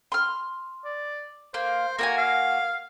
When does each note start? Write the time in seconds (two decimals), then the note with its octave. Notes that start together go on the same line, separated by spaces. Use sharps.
0.12 C6 F6
0.85 D5
1.54 A#3 C5
1.99 A#3 F#4 G#5 A#5
2.18 F5